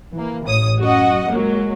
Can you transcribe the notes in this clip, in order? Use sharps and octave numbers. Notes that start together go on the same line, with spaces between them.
E3 A#3
A1 C#5 D#6
F#2 F#4 D#5 F#5
F#3 G#3 A#3